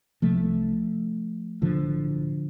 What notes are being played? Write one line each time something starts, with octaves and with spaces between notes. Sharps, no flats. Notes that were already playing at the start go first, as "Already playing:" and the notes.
C2 C3 F3 A3
B1 A2 D3 F3